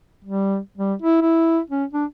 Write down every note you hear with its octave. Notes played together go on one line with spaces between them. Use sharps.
G3
G3
E4
E4
C#4
D4